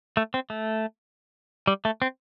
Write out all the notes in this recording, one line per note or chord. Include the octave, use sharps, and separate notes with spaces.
A3
C4
A3
G3
A3
C4